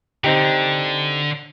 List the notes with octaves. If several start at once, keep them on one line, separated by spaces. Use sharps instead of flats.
D3 C4 D#4 G4